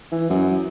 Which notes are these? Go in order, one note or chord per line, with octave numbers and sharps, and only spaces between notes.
E3
F#2